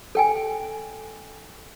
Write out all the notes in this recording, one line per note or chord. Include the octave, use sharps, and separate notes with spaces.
A4 G5 G#5